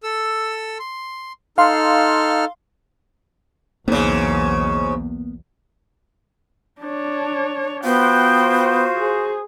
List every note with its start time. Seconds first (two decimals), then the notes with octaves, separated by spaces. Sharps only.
0.03 A4 E6
0.79 C6
1.58 D#4 A4 F5 C6 F6
3.88 B1 E2 G#2 C#3 A#3 B3
6.82 D4 C#5
7.84 B3 F4 F#4 C5 G5
8.95 G#4